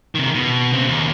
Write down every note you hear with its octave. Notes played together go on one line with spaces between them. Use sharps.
C3 D#3
B2
C#3 C4
D#2